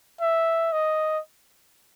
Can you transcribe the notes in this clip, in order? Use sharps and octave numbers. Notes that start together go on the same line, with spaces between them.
E5
D#5